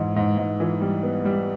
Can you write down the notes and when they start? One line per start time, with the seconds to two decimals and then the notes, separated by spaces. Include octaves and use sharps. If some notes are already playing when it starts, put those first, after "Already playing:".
Already playing: G#2 E3
0.16 G#2
0.38 G#2
0.60 E3
0.81 G3
1.03 B3
1.25 G3